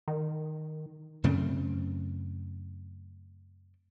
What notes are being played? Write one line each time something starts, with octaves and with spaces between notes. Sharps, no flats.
D#3
F#2 C#3 A3 C4